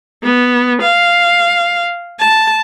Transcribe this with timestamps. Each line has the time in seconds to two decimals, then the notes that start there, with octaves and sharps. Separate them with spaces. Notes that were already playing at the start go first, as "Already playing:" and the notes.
0.23 B3
0.82 F5
2.19 A5